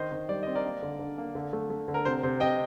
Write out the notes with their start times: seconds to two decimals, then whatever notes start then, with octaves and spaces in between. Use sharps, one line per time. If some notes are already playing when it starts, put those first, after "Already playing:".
Already playing: D#3 C5 D#5
0.12 D#3
0.29 G3 D5
0.43 C4 D#5
0.55 A#4 D5
0.65 A#3
0.82 D3
0.99 D3
1.18 A#3
1.35 D3
1.53 A3
1.70 A3
1.88 D3
1.94 A#4
2.05 C3 C5
2.23 C3 C5
2.40 C3 D#5 G5